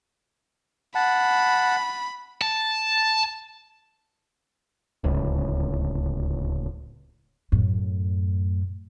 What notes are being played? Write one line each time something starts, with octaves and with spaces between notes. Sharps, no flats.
F#5 A5 B5
A5
D1 C#2
F#2 A2